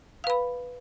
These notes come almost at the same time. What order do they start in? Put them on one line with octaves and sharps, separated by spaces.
F5 B4 B5